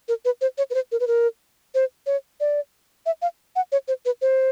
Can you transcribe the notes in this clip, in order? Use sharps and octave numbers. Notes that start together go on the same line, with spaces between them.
A#4
B4
C5
C#5
B4
C5
A#4
B4
A#4
C5
C#5
D5
E5
F5
F#5
C#5
C5
B4
C5